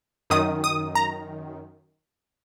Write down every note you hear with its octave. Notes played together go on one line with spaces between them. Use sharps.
F#2 D#3 D#6
D#6
A#5